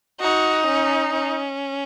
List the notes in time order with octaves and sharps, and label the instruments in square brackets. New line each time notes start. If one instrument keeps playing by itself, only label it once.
[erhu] D#4 [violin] F#4
[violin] C#4
C#4